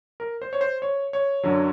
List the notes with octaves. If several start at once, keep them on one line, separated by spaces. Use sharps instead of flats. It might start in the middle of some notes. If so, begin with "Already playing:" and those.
A#4
C5
C#5
C5
C#5
C#5
F#2 D3 F#3